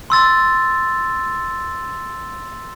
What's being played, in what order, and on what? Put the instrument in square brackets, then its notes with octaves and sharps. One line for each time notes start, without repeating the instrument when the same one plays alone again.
[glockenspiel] C6 E6 A6